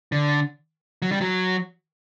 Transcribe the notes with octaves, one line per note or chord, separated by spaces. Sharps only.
D3
F#3
G3
F#3